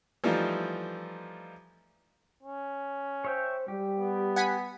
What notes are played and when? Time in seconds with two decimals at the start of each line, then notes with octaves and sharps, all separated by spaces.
0.24 E3 F3 G3 A3 D#4 F4
2.43 C#4
3.25 C5 C#5 E5 G5
3.68 G3 G4
3.99 B3
4.36 F#5 G#5 B5